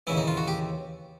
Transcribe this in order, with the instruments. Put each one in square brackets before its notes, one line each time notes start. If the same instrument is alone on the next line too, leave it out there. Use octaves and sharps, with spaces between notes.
[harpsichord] D#2 C#3 E3 E4
D#4
F4
F#4
G4